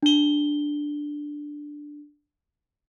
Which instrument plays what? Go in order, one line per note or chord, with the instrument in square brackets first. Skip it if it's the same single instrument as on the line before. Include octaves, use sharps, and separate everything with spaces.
[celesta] D4 G7